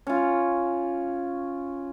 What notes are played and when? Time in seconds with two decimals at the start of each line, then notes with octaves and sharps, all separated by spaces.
0.07 C#4 F4